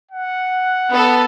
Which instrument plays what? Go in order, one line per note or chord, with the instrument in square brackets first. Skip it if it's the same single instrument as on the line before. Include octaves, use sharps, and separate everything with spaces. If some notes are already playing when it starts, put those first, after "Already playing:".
[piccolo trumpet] F#5
[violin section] B3 A4